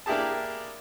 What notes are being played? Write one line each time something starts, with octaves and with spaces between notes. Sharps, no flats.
A#3 D4 E4 G4 G#4 A5